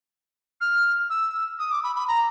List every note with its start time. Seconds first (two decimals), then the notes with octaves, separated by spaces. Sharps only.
0.61 F6
1.10 E6
1.59 D#6
1.71 D6
1.84 B5
1.96 B5
2.08 A#5